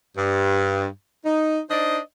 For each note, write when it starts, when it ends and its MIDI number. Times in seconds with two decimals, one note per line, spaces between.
0.17 0.87 43
1.25 1.60 63
1.70 1.99 62
1.70 1.99 63
1.70 1.99 72
1.70 1.99 74
1.70 1.99 75